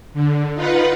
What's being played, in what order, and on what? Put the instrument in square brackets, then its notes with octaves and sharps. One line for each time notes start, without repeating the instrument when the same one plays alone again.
[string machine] D3
D#4 F4 B4 F#5